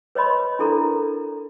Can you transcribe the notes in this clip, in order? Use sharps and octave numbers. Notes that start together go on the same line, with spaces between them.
B4 C#5 D#5 B5 C6
D4 E4 A4 A#4 A#5